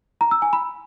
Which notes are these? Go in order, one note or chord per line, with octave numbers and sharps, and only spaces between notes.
A#5
E6
G#5
B5